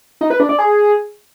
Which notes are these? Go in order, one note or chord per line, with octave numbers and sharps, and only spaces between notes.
D#4
B4
D4
D5
G#4